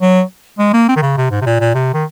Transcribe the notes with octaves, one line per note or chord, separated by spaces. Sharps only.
F#3
G#3
A#3
C4
D#3
C#3
C3
G#2
C3
A#2
A#2
C3
D#3